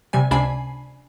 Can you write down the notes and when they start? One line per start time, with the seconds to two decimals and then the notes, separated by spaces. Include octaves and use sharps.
0.13 C3 G3 G#5
0.31 C#2 C3 D4 G#5 B5 C7